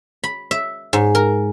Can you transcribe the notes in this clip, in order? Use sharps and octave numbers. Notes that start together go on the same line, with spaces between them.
B5
E5
G#2
A#4